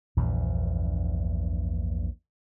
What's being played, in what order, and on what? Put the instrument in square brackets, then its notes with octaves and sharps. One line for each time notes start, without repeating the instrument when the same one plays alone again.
[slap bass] A#1 E2 G2 A#2